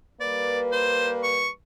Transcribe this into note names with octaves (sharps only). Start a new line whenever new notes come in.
G3 A#3 B4 D5
C5
C#6